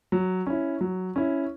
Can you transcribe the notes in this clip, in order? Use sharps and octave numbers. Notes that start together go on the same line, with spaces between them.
F#3
C#4 E4
F#3
C#4 E4